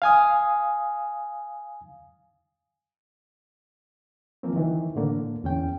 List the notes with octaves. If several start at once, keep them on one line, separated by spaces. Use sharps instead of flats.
F5 G#5 D#6
E3 F3 A#3 C4
D#3 E3
A2 D3 A#3
E2 C#4 G5